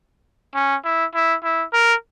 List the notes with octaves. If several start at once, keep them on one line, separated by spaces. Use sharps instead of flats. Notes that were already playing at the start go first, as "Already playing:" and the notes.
C#4
E4
E4
E4
A#4